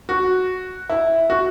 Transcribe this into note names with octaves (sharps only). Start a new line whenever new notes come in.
F#4
E4
F#4